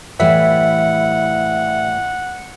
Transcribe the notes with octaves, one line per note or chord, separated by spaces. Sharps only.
A2 E3 G3 E5 F#5